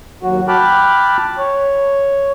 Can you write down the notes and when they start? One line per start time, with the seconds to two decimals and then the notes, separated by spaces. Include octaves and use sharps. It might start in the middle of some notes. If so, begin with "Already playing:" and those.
0.23 D#2 F#3 F#4
0.48 G5 A5 B5 D6 F6 F#6
1.38 C#5